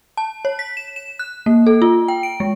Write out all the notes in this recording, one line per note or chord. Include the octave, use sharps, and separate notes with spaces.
A5
C#5
B6
E7
E7
F#6
A#3
A4
F4
G5
D7
G#3